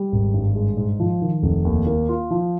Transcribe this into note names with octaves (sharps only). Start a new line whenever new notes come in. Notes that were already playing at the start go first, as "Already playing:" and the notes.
Already playing: G3
G#1
G2
G#3
G#2
F3
D#3
F1
D#2
A#3
F4
F3